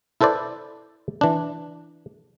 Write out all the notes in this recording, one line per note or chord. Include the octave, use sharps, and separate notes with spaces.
E4 A4 B4 C5 D5
E3 D4